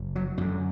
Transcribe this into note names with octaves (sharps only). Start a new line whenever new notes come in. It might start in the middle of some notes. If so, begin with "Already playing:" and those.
Already playing: F#1
F#3
F#2 D3 F#3